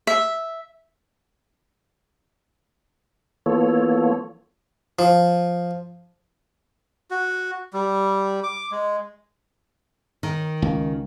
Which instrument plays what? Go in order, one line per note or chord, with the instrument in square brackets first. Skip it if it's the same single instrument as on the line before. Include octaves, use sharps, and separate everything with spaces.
[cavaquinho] E5
[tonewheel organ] E3 A#3 B3 F4 A4 C#5
[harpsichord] F3
[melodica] F#4
G3
D6
G#3
[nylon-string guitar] D#3
[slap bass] C#2